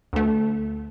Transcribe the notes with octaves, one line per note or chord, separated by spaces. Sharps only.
D2 A3